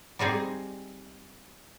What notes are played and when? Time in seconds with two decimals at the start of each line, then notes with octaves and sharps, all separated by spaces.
0.19 G3 C4 D#4 G#4